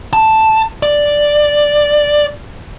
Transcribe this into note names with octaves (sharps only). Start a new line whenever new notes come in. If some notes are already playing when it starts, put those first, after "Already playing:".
A5
D5